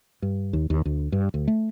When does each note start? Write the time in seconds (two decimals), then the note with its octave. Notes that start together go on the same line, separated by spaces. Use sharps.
0.22 G2
0.53 D#2
0.70 D#2
0.85 D2
1.12 G2
1.34 D2
1.48 A3